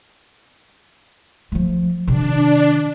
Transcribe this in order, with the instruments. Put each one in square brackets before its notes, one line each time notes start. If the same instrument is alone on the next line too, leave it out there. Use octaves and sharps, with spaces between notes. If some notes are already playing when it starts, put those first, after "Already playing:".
[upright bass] F3 A3
[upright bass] C3 D#3 [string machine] D4